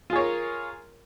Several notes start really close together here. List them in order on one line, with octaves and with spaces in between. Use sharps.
F4 G#4 C#5 A#4